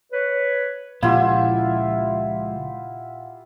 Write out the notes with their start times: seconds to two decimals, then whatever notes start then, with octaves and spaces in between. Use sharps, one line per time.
0.12 B4 C#5
1.03 C#2 A#2 F3 E4 F4 G4 F5 F#5